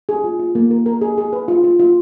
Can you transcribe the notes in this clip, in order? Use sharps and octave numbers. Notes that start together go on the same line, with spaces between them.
G#4
F4
F4
A#3
A#4
A#4
G#4
G#4
B4
F4
F4
F4